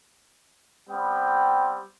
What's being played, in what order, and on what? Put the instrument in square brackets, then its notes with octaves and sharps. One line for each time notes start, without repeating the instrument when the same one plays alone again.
[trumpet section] G3 B3 C4 G5